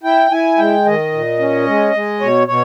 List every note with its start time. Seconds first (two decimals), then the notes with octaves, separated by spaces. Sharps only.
0.03 E4 G5
0.31 E4 G#5
0.58 G#3 G5
0.85 D#3 D#5
1.12 A#2
1.39 C#4
1.67 G#3
1.94 G#3
2.20 B2 C#5
2.47 B2 C#5